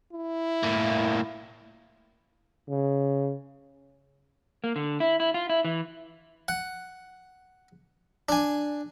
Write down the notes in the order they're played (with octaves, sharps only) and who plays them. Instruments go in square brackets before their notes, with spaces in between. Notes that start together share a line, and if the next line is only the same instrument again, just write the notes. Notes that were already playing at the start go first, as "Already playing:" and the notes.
[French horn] E4
[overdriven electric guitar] A2 A#3
[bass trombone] C#3
[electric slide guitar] A#3
D3
E4
E4
F4
E4
E3
[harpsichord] F#5
D4 G#5